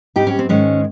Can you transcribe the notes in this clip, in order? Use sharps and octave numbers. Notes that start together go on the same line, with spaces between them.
G#2 G3 C4 D#4 G4
C#4
C4
G#2 D#3 G#3 C#4